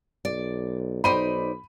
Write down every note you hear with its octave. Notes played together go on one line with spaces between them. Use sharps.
B1 D5
B1 D#4 C5 D5 B5 D#7